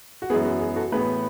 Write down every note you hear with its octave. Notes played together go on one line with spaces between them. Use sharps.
F#4
F#2 E3 G#3 B3 G#4
F#4
G#4
F#4 A4
A2 E3 B3 G#4 B4